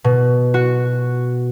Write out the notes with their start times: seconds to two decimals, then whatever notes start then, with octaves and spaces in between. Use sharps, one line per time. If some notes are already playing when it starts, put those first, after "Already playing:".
0.04 B2
0.54 F#4